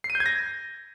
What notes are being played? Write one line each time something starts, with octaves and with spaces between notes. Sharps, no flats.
C7
D#7
G6
G#6
A#6